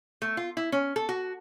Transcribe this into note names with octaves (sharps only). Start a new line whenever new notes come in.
A3
F4
E4
C#4
A4
F#4